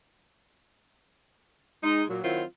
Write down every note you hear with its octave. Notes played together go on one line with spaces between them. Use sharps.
G#3 D#4
A#2 F#3
D#3 F#3 C4 E4 F4